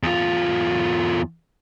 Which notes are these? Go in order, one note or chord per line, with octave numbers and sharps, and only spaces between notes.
E2 F4